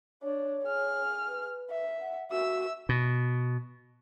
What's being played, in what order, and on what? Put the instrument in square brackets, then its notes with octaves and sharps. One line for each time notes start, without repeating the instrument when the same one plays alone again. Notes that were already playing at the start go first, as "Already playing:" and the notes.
[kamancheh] D4 [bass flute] C#5
[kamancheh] G#4 F6
[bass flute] B4
[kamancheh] E5
[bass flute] F#5
[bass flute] F#4 [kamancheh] E5 E6
[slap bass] B2